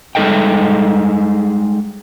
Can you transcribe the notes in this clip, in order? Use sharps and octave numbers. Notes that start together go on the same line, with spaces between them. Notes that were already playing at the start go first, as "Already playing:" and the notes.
G3 G#3 D#4 A4 D#5 G5